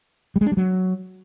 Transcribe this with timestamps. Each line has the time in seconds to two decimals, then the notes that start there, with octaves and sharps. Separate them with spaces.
0.36 G3
0.41 G#3
0.46 D4
0.52 G3
0.57 F#3